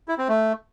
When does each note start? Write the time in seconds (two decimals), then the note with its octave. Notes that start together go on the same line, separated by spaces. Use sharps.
0.08 E4
0.18 C4
0.28 A3